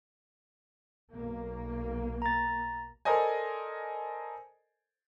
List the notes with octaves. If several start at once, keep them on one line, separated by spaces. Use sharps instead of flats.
B1 A#3
A#5 A6
A4 A#4 C5 D5 D#5 G#5